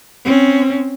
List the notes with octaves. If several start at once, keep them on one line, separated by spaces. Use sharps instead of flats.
C4 C#4